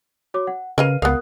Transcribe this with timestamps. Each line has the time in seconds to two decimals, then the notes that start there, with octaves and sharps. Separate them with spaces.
0.34 F#4 C#5 D6
0.47 F#5
0.78 C#3 A#4 B4 D#5 F5 F6 D#7
1.02 C#2 B3 A#4 F5 D#6 F#6